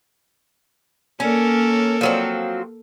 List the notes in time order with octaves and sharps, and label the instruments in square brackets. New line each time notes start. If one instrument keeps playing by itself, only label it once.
[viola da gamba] A#3 A4 A#4 [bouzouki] C#4
[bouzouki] F3 F#3 C4